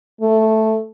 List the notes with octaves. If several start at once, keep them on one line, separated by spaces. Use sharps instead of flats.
A3